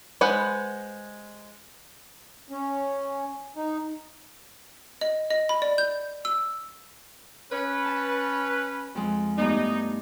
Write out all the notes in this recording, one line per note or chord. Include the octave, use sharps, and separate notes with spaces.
G#3 B4 C5 F#5
C#4
D#4
D#5
D#5
B5
D5
G6
E6
C#4 B4
A5
F2 G#3
G2 A3 B3 D#4